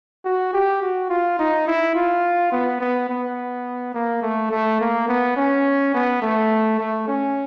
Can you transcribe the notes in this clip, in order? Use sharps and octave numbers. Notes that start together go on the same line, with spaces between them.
F#4
G4
F#4
F4
D#4
E4
F4
B3
B3
B3
A#3
A3
A3
A#3
B3
C#4
B3
A3
A3
C#4